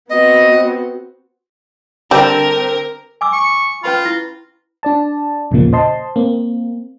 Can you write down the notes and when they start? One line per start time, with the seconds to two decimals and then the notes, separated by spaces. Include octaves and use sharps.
0.10 B3 C4 F#4 D#5
2.11 D3 G3 C4 A#4
3.21 G#5 D6 E6
3.33 C#6
3.84 C#4 F4 B4 B5
4.05 E4
4.83 D4 D5 A5
5.51 B1 E2 A#2 C#3 F3 A#3
5.73 C5 D#5 A5 C6
6.16 A#3 C4